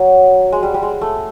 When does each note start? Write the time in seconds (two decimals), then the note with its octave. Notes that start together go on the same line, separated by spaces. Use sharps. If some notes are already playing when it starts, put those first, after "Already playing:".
Already playing: F#3
0.52 G#3
0.63 G3
0.74 G3
0.83 G#3
1.01 A3